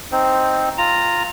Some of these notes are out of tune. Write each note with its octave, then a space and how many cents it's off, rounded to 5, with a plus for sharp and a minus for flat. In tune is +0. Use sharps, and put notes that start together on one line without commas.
C4 +0 D#4 +0 C5 +0
F4 +0 A#5 -10